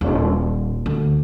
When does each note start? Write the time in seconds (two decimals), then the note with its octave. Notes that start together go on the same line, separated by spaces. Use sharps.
0.01 D#1
0.86 D2